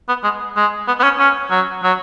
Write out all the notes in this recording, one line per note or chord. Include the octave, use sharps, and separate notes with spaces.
B3
G#3
G#3
B3
B3
C#4
C#4
F#3
F#3